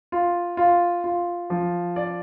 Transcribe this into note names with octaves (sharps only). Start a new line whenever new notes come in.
F4
F4
F4
F3
D5